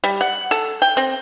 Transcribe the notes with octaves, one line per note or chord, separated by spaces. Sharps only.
G3
F#5
A4
G5
C4